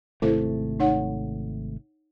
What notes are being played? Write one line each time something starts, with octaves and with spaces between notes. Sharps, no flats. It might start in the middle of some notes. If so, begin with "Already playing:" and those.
G#1 C3 A3 E4 A4 C5
D#4 C#5 F#5